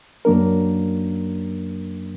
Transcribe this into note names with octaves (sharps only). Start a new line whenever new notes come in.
F#2 F#3 A#3 D4 A#4